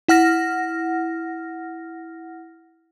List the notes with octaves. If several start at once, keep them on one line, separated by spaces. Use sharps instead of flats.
E4 F#5 F6 A#6